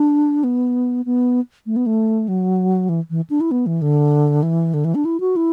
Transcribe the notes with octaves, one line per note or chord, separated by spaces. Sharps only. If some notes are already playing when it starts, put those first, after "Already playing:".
Already playing: D4
B3
B3
A3
B3
A3
F#3
E3
E3
D4
E4
B3
E3
D3
E3
D3
E3
D4
E4
F#4
E4